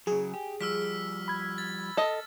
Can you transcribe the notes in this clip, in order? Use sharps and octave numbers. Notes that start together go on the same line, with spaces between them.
C#3 F#3 G#4
G4
F3 G3 E6 F6 B6
B5 G#6
A6
A4 D#5